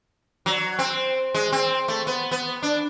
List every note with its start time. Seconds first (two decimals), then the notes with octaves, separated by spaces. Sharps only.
0.46 F#3
0.79 C4
1.35 G#3
1.52 C4
1.88 A3
2.07 B3
2.31 B3
2.63 D4